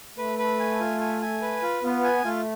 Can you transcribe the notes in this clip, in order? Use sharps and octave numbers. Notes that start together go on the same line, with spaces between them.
A3 B4
B4
G#5
F4
G#5
G#5
B4
F4
B3 F4
G#5
A3 F4